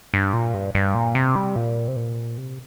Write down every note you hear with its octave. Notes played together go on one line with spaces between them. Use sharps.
G2
A#2
G2
G2
A#2
C3
G3
A#2
C3
A#2
C3